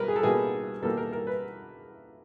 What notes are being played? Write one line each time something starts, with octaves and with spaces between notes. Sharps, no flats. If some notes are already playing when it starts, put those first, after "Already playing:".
Already playing: B2 G3 A#4 B4
G#4
A4
B2 G3 A#3 G#4
B2 G3 A#3 A4
A#4
A#4
B4